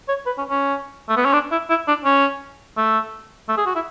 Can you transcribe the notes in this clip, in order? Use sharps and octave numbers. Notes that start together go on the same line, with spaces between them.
C#5
B4
C#4
C#4
A3
B3
C#4
D4
E4
E4
D4
C#4
A3
A3
G#4
F#4
E4